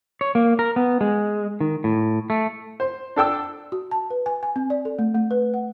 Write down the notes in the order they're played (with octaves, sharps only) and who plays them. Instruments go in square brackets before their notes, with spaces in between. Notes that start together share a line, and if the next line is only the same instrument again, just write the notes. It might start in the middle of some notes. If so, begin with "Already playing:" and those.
[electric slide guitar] C#5
A#3
A#4
B3
G#3
D#3
A2
A3
[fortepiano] C5
D4 A4 G5 E6
[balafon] F#4
A5
B4
G#5
G#5
C4
D5
A4
A3
A3
B4
F#5